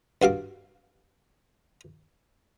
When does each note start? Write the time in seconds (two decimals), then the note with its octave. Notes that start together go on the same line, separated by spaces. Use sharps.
0.22 G2 F#4 F5 D6